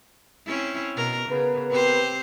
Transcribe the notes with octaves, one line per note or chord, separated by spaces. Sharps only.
C4 C#4 E4
B2 A#4
C#3 B3 A#4 B4
C4 G4 C5